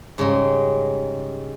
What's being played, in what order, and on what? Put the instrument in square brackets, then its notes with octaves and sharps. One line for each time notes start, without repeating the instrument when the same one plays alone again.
[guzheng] G#2 C#3 G3 G#3